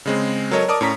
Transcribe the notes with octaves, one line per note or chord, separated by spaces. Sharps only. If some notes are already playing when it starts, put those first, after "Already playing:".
C#3 G#3 C4
F#3 A4 A#4 C#5 D#5
A#4 D5 A5 D6 D#6
A2 C#4 A#5 B6